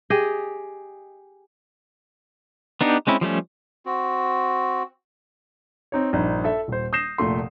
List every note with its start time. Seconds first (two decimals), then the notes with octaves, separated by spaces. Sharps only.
0.10 G4 G#4 D#5
2.81 B3 D4 D#4 G4
3.07 G#3 C4 C#4 E4
3.21 F3 G3 A3 C#4
3.86 C4 F#4
5.92 C4 D#4 C#5
6.13 A#1 G2 D#4
6.44 A4 E5
6.68 D#1 C5
6.93 D#6 G6 A#6 C7 E7
7.18 F1 A#2 A3 C6